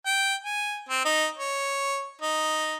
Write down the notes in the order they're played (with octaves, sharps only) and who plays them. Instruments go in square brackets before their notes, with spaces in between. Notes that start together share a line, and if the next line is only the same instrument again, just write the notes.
[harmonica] G5
G#5
C4
D#4
C#5
D#4